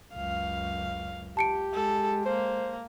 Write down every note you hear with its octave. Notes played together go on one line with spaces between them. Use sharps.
C#2 F#2 F5
C#2 G4 A5 C#7 D7
G#3 A4
A#3 C5